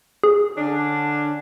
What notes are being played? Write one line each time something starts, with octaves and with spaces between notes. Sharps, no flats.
G#4
D3 C#4 D4